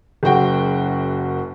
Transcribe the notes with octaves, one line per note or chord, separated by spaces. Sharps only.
F#1 F#2 F#4 G5